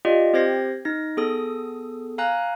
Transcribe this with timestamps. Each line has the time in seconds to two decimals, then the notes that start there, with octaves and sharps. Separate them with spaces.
0.05 F4 G4 D5 D#5
0.33 C4 G4 C5 G#6 A#6 C7
0.85 D#4 A#6
1.17 B3 G#4 A4 D#6
2.18 F5 G#5 A#5 F#6